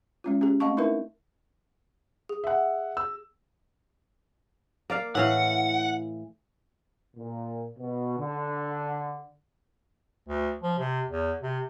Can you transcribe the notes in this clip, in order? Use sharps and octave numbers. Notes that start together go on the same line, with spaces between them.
G#3 C#4 F4
C#4 G4 G#4
A3 C4 D#5 F5 A5 C#6
D#4 E4 A#4 B4 E5
G#4
E5 F#5
E6
A#3 D5 F5
A2 E3 F5 F#5
A#2
B2
D3
D2
F3
C3
E2
C3